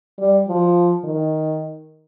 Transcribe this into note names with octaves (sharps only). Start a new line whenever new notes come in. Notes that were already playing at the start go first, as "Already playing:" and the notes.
G3
F3
D#3